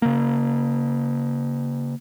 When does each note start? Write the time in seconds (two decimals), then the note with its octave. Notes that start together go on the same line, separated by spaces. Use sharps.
0.02 C#3 A#3